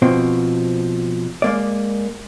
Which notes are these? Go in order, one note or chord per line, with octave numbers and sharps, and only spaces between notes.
B2 F3 C4
G#3 A#3 D5